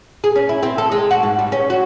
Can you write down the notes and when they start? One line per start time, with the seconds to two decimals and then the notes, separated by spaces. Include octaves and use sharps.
0.24 G#4
0.35 C#4
0.49 E4
0.63 C4
0.78 A4
0.92 G#3
1.11 F#4
1.23 G#2
1.39 G3
1.52 C#4
1.70 F#4